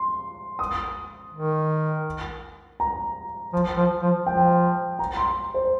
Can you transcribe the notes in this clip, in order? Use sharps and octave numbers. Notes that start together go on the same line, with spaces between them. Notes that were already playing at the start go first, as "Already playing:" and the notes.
Already playing: C6
D#6
D#3
A#5
F3
F3
F3
F3 G5
A#5
C6
C5